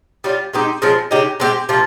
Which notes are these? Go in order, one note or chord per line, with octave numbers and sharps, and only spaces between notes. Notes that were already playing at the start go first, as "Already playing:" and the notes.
G3 C#4 F4
G#3 C4 D#4 G4
C#3 F3 G#3 C4
C#3 G#3 D#4 G4
G#3 C4 G4
C3 F3 A#3 F4